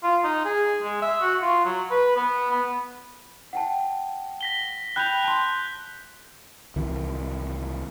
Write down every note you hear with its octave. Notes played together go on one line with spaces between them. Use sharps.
F4
D#4
G#4
G#3
E5
F#4
F4
F#3
B4
B3
B3
F#5 G5 A5
A#6 B6 G7
G5 B5 F#6 G6 F7 G7
A5 C6
C2 D#3 E3